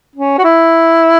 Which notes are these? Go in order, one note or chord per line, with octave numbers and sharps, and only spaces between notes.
C#4
F#4
E4